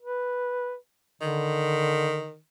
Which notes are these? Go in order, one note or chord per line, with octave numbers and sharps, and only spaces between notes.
B4
D3 D#3